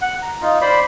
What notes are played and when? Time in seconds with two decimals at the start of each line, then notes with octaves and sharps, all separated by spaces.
0.02 F#5
0.22 A#5
0.41 D#4 F4
0.61 C5 D5 B5 C6